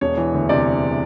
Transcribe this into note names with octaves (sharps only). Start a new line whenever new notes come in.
E1 C#5
E3
D2
C3 D5